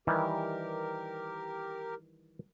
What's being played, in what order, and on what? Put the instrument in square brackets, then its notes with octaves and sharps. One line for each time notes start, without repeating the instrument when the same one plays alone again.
[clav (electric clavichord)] D#3 E3 G3 [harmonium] G4 A#4